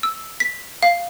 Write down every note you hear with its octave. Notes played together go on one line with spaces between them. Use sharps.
E6
B6
F5